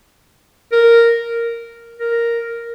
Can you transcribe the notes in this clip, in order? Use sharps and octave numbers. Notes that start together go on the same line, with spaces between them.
A#4
A#4